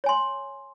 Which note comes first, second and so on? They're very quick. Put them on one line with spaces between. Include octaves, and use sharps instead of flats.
C#5 G#5 C6